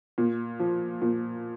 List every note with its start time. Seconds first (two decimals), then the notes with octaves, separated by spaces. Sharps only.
0.18 A#2
0.59 F3
1.02 A#2